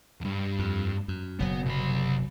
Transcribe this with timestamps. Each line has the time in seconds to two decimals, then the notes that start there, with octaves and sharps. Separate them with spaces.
0.21 E2 G2
0.59 F2
1.08 F#2
1.40 F#1 B2 F#3 B3
1.66 C2 B5